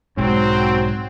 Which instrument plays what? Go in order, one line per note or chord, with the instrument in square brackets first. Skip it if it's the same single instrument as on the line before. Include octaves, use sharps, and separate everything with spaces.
[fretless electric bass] B1 G#2 [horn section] F#3 C4